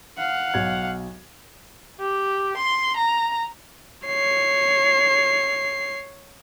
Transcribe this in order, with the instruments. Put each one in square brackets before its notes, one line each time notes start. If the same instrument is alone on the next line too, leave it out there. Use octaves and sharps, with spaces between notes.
[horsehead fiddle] F5 F#5
[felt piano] B1 G#6
[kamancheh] G4
C6
A#5
[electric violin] C#5 C7